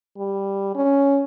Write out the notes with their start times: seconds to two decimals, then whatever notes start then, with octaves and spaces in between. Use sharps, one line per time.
0.18 G3
0.75 C#4